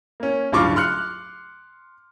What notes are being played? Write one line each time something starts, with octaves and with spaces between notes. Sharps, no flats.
A#3 C#4
D1 G2 C#3 F4 C#6 D6
C6 F6 F#6 C#7